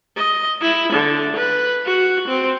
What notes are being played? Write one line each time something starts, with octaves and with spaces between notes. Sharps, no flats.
D#5
E4
D3
B4
F#4
C4